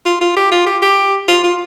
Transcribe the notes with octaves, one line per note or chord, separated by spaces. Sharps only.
F4
F4
G4
F4
G4
G4
F4
F4